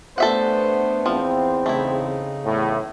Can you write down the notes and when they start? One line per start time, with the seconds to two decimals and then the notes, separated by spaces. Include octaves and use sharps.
0.18 A3 B3 D4 A4 C5 E5 F#5
1.06 E2 F3 C4
1.66 C#3 A3 D#4 E4
2.45 E2 A2